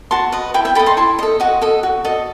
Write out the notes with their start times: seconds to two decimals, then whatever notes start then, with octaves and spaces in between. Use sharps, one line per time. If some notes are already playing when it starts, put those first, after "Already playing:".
0.11 F#4 A5 C6
0.32 B4 D#5
0.54 E4 G5 B5
0.65 E5 G5
0.75 A4 G5 B5
0.79 D#5
0.86 A5 C6
0.97 E4 A5 C6
1.19 A4 D#5
1.40 F#4 D#5 F#5
1.62 A4 D#5
1.83 F#4
2.05 A4 D#5